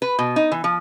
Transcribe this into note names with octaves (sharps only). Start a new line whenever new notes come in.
B4
B2
D#4
E3
F3